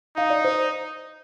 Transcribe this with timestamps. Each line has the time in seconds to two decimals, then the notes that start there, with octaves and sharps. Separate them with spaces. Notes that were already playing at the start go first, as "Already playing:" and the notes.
0.17 D#4 F5
0.30 D5
0.44 C5